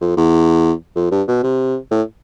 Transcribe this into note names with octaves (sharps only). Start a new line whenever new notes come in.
F2
E2
F2
G2
B2
C3
A2